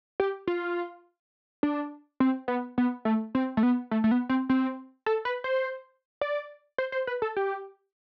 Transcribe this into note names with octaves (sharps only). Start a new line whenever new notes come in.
G4
F4
D4
C4
B3
B3
A3
C4
A3
B3
A3
A3
B3
C4
C4
A4
B4
C5
D5
C5
C5
B4
A4
G4